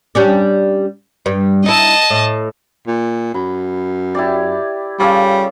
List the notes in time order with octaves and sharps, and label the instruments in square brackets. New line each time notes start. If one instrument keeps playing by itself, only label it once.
[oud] G3 C#4 D4
G2
[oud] D#4 E4 [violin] D#5 A5
[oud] A2
[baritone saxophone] A#2
[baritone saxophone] F#2 [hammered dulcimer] B5
[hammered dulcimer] E4 G4 D5
[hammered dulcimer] C#3 F4 A4 [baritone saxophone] G3